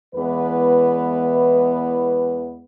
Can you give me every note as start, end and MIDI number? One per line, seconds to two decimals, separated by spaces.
0.15 2.64 40
0.15 2.64 52
0.15 2.64 56
0.15 2.64 59
0.15 2.64 71